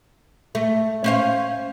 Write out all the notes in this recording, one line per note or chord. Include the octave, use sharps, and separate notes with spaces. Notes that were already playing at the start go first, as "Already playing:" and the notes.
A3
C#4 C5 F5